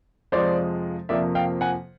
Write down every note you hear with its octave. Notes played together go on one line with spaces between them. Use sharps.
F2 C3 F3 G#3 C5 D5
F2 C3 F3 A#3 D5 E5
F5 G5
F#5 G#5